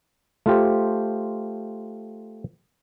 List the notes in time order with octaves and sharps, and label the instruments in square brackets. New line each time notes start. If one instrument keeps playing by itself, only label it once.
[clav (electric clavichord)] A3 F4 G4 C5